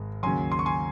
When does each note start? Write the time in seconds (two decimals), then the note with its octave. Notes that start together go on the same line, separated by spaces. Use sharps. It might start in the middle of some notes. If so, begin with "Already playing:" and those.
Already playing: G#1 G#3
0.23 D#2 C#3 F#3 G#5 C6
0.52 C6
0.59 C#6
0.66 G#5 C6